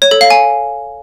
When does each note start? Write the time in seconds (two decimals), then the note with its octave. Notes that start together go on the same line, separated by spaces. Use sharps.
0.02 C#5
0.11 A4
0.21 F5
0.30 G#5